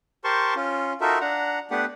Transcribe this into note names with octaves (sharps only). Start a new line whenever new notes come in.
G4 A#4 C5 A5 C6 C#6
C#4 F4
D#4 F4 F#4 A4 A#4 E5
D4 F#5 A#5
A3 B3 D4 G4 B4 F#5